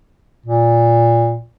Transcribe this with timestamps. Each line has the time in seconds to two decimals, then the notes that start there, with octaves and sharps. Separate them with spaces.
0.46 A#2